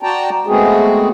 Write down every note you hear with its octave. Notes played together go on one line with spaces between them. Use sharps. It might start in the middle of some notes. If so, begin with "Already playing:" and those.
F#4 D5 G5 A5 A#5
G#3 A3 B3 C4 F#4 G#4